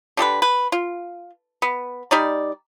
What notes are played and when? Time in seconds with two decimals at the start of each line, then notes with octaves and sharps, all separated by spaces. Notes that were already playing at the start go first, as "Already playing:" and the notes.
0.17 D3 G4 A4 B4
0.42 B4
0.72 F4
1.62 B3
2.11 G3 D#4 D5